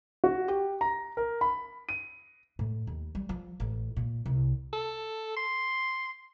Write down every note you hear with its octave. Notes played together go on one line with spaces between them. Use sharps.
F#4
G4
A#5
A#4
B5
D#7
A2
D#2
G3
F3
A1
A#2
C2
A4
C6